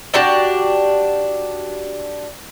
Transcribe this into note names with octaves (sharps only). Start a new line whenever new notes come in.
D4 F#4 G4 D5